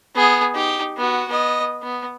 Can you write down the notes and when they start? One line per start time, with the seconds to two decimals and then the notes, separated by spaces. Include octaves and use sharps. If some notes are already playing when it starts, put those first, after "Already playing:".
0.15 B3 G#4
0.54 D#4 G4
0.97 B3 F#4
1.28 B3 D#5
1.82 B3